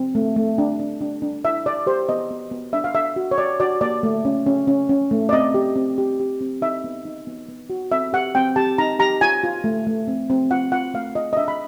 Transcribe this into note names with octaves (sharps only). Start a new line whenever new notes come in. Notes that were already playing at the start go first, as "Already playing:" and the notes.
Already playing: C4
A3
A3
D4
D4
D4
D4
E4 E5
G4 D5
G4 C5
B3 D#5
B3
B3
D4 E5
F5
D4 E5
F#4
C#5
F#4 D5
F#4 D5
A#3 D5
A3
C#4
C#4
C#4
C#4
A3
D5
C4 D#5
G4
C4
G4
G4
C4
D#4 E5
B3
D#4
B3
B3
F#4
C4 E5
G4 F#5
C4 G5
G4 A5
D#4 A#5
G4 A#5
F4 G#5
F4
A3
A3
C4
C4
F4 F#5
F4 F#5
A3 F5
F4 D#5
D#5
D4 E5
B5